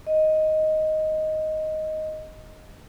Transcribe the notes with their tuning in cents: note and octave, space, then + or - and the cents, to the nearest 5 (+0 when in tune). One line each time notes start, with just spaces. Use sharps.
D#5 +5